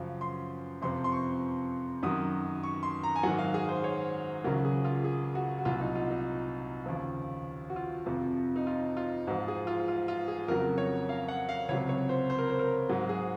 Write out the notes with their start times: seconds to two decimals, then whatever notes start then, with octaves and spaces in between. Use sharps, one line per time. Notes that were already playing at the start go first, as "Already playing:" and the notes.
Already playing: F#2 C#3 F3
0.21 C6
0.82 F2 C3 F3 C6
1.04 C6
1.12 C#6
2.03 F#2 D#3 F#3 D#6
2.63 C#6
2.83 C6
3.03 A#5
3.16 G#5
3.23 F#3 F#5
3.26 G#2 D#3
3.39 F5
3.54 G#4
3.69 C5
3.84 C#5
4.44 C#2 C#3 F#3 A#4
4.65 G#4
4.85 F4
5.04 G#4
5.35 F#4
5.59 F#4
5.65 C2 A#2 F#3 F4
5.80 D#4
5.95 F4
6.11 D#4
6.86 D#2 C#3 F3
7.70 F#4
7.76 F4
8.06 F2 C3 F3
8.56 D#4
8.67 F4
8.97 F4
9.27 G#2 F#4
9.31 F3
9.48 G#4
9.67 F4
9.88 F4
10.08 F4
10.28 G#4
10.48 F2 C#3 F#3 A#4
10.78 C#5
11.09 F5
11.28 F#5
11.49 F5
11.69 C#2 C3 F#3 C#5
11.89 C#5
12.09 C5
12.30 C5
12.39 A#4
12.49 C5
12.59 A#4
12.89 G#2 F#3 G#4
13.09 G#4